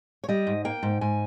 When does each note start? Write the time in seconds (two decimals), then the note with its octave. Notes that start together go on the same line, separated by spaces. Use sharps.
0.24 C#5
0.29 G3 D#5
0.47 G#2
0.65 A#3 G5
0.83 G#2
1.01 G#2 G#5